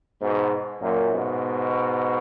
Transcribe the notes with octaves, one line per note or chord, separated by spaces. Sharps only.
G#2 B2
F#2 A#2
G#2 B2